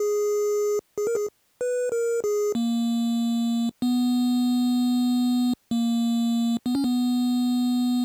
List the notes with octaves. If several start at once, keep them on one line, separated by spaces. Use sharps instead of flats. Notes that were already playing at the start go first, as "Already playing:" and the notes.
Already playing: G#4
G#4
A#4
G#4
B4
A#4
G#4
A#3
B3
A#3
B3
C#4
B3